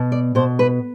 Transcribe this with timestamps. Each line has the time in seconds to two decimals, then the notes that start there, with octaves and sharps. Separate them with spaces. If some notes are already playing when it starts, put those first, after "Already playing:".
Already playing: B2
0.12 D5
0.35 B2 C5
0.59 B4